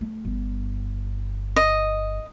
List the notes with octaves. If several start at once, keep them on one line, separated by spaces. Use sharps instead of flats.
A3
G1
D#5